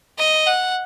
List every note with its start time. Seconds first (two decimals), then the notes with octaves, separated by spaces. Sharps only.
0.18 D#5
0.47 F#5